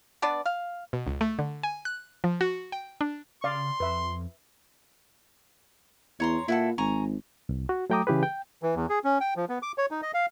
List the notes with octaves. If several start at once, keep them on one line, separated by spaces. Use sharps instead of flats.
B3 D4 B4 D5
F5
B2
C#2
A3
D3
G#5
F#6
F3
F#4
G5
D4
C#3 D5 F5 C6
F2 B4 E5
E2 C#5 A#5 C6
A#2 E4 F#4 A4
G#1 G#5 A#5 C#6
C2
F#4
F#3 A3 G5 A#5 D6 D#6
C#3 E3 G4 G#4 B4
G5
E3
E2
G#4
C#4
G5
F3
B3
D6
C#5
D#4
D#5
F5